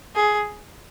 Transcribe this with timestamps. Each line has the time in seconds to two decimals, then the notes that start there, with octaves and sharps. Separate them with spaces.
0.16 G#4